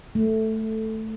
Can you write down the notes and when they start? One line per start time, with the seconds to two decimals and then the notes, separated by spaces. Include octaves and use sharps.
0.15 A3